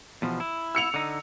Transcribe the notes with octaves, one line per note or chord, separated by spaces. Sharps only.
E2 B2 F3
E4
E6 C#7 F7
D3 D#4